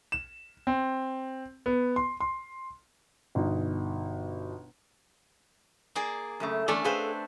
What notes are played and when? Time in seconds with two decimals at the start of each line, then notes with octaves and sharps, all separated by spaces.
0.12 E7
0.67 C4
1.66 B3
1.96 C6
2.20 C6
3.35 G1 B2 D#4
5.95 A#3 G#4 D5
6.40 F#2 C#3 A3
6.68 E2 A3 C#4 D4 A4 D5
6.84 C4 G#4 A4 B4 C5 F5